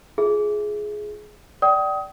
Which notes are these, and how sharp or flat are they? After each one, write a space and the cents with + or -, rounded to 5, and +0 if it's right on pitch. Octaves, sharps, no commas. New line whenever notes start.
F4 +0 G#4 +15 E5 +0
D5 +0 G5 -35 D#6 +20